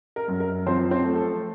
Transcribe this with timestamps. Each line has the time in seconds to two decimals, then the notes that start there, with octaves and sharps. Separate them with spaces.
0.16 A#4
0.28 F#2
0.40 A#4
0.66 F3 C4 C5
0.91 C4 C5
1.04 A3
1.16 A4